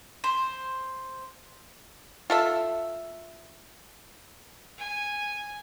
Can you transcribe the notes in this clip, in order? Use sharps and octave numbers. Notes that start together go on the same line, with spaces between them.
C5
F4 A4 E5
G#5